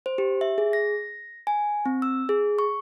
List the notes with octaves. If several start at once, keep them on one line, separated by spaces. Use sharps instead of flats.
C5
G4
E5
G#4
A#6
G#5
C4
E6
G#4
C#6